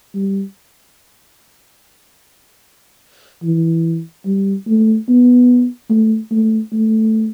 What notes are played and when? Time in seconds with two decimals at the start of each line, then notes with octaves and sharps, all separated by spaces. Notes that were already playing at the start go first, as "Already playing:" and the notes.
0.15 G3
3.43 E3
4.26 G3
4.68 A3
5.09 B3
5.90 A3
6.31 A3
6.73 A3